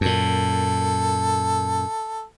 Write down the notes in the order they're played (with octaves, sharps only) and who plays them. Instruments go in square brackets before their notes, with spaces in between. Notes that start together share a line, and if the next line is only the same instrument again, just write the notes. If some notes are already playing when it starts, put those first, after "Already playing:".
[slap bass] F#2 A#2 [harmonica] A4